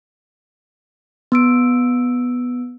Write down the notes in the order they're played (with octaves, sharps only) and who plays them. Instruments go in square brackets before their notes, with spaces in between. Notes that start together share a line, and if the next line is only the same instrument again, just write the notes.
[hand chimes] B3 E6 D7